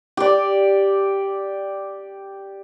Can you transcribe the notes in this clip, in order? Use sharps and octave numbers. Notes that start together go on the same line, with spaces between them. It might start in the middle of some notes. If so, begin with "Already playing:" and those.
G4 D5